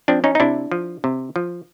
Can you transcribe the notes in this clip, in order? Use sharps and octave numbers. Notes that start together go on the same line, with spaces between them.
F3 C4 D4
C#4 D#4
D#4
C3 D4 E4
F3
C3
F3